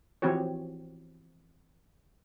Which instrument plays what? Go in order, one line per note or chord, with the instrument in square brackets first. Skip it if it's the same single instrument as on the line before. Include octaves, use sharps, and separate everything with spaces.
[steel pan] E3 F3 C4 F#4 G4 C#5